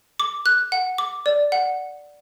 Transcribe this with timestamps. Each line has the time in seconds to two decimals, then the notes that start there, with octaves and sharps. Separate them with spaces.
0.20 D6
0.46 F#6
0.72 F#5
0.98 D6
1.26 D5
1.52 F#5